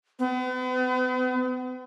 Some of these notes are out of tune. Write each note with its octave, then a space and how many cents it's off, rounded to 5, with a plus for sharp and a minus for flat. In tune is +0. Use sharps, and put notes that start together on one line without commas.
B3 +40